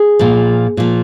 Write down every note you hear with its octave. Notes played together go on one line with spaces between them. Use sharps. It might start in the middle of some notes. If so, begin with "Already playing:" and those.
Already playing: G#4
A#2 F3
A#2 F3